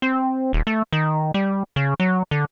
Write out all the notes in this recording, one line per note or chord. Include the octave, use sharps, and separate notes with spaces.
C4
D#1
A3
D#3
G3
C#3
F#3
D3